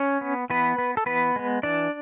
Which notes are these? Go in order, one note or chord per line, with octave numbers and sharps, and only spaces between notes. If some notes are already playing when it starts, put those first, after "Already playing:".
Already playing: C#4 C#5
B3
E3 B3 B4
B3
A4
E3 B3 B4
G#3 B3
E3 D4 D5